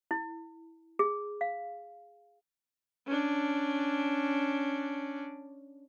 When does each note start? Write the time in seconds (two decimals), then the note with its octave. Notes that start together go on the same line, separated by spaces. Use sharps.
0.11 E4
0.99 G#4
1.41 F5
3.07 C#4 D4